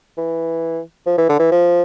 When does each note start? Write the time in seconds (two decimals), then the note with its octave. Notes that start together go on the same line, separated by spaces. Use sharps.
0.18 E3
1.06 F3
1.18 E3
1.29 D3
1.39 E3
1.52 F3